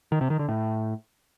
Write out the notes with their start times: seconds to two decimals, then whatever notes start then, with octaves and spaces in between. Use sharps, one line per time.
0.12 D#3
0.21 C3
0.30 D#3
0.39 D3
0.49 A2